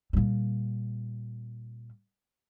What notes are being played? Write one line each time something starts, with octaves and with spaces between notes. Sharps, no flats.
A#2 G3